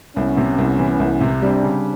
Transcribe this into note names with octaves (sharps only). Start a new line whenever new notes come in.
C2 B3 C#4
C3
C2
E3
C2
C3
G3 C4 D4
C#3